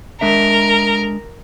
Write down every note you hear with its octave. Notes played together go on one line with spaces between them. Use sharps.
G#3 D4 A#4 E5